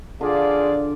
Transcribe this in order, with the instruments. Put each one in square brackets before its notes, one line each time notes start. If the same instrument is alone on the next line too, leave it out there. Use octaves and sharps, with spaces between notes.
[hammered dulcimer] D3 [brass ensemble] F4 D5 [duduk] G#4